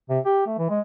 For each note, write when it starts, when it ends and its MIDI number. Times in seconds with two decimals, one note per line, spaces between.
0.10 0.19 48
0.26 0.42 67
0.47 0.55 57
0.59 0.69 52
0.70 0.81 56